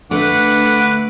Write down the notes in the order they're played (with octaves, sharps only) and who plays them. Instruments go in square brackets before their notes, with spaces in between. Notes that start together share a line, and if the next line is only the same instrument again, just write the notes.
[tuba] D3 [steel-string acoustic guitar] A3 [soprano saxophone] B4 [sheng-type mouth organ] F#5 D6